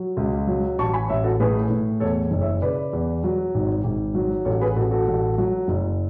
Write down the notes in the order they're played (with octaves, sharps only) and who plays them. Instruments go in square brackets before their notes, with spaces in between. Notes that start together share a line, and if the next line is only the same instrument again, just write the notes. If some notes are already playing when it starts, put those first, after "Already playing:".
Already playing: [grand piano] F#3
C#2
F#3
A1 A5 C#6
G#5 B5
A1 C#5 E5
F#4 A4
A2 G#4 B4
A2
E2 A4 C#5
F#1
C#5 E5
C#3 B4 D5
E2
F#3
G#1
G#1
F#3
A1 A4 C#5
G#4 B4
A1 F#4 A4
F#4 A4
A1
F#3
F#1